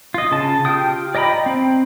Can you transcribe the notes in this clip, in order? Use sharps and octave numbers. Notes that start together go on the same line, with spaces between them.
F4 D#5
C#3 A5
F4 G4 G5 D#6
D5 D#5 G5 A#5 B5
C4